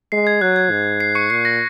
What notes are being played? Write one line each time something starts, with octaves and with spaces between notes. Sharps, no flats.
G#3 C7
G#6
F#3 F#6
G#6
G#2
C7
C#6 C#7
A#2 C7
A#6